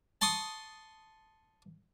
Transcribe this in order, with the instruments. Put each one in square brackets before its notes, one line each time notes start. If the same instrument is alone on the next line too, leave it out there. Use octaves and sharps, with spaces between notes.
[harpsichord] A5 C6 C#6 D#6